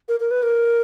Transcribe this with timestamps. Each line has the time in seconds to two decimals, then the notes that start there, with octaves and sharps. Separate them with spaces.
0.09 A#4
0.20 A#4
0.31 B4
0.43 A#4